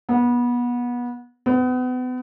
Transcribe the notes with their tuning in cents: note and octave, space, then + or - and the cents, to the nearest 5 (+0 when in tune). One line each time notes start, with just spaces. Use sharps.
B3 -25
B3 +35